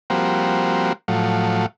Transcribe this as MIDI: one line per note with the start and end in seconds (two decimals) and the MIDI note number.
0.10 0.93 53
0.10 0.93 55
0.10 0.93 58
0.10 0.93 60
0.10 0.93 66
1.08 1.66 45
1.08 1.66 53
1.08 1.66 54